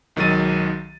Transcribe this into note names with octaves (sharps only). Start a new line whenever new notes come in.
B1 D#3 F#3 G#3 A6 D#7